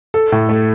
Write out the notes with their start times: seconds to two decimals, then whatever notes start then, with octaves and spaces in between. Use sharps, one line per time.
0.14 A4
0.32 A2
0.49 A3